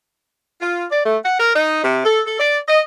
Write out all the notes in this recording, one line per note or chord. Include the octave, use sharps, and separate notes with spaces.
F4
D5
A3
F#5
A#4
D#4
C3
A4
A4
D5
D#5